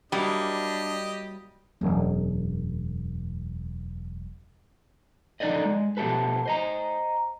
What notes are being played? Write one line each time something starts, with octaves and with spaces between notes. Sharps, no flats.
F#3 G3 A#3 D4 E4 G4 D#5
E1 F#2
D3 F3 D#4 A4 D5 D#5
G#3
B2 F3 A3 G4 A4 B4
C5 D#5 A#5